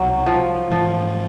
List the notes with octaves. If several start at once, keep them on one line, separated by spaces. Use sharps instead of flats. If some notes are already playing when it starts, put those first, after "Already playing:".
Already playing: C2 B2 F#3 G3
F3
G#2 E3 F3 G#3 C#4